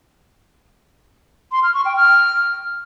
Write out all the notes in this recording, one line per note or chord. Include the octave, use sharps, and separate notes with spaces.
C6
F6
C#6
G5
F6